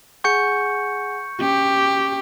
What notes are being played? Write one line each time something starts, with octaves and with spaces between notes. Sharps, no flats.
G#4 F#5 G#5 C#6 G6 C#7
C#4 G4